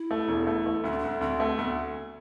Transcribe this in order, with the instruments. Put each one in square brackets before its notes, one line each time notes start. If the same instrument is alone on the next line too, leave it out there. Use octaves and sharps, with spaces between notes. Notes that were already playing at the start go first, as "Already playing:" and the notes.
Already playing: [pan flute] E4
[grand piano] A3
E1
A3
A3
[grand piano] D2 [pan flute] D4
[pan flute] C4
D4
[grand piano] D2
[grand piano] D2 [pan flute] C4
[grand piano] A3
[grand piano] D2 [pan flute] B3